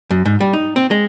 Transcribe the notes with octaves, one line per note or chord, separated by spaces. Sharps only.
F#2
G#2
G3
D#4
C4
G#3